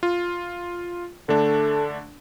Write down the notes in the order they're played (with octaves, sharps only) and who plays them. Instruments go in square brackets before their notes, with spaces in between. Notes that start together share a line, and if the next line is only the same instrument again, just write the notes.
[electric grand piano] F4
[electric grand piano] D3 A3 D4 [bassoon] A4